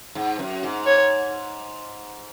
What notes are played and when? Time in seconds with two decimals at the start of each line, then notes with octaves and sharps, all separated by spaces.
0.15 G#2
0.39 F#2
0.63 G#2
0.86 C#5